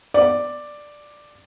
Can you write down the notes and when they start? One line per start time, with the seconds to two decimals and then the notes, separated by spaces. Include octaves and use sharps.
0.14 D5